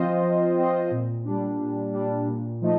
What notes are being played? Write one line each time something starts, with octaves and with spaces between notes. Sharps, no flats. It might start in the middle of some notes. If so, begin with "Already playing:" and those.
Already playing: F3 C4 F4 C5 D#5
F3
C4 F4 C5 D#5
A#2
G3 D4
A#2
G3 D4
A#2
F3 A3 D#4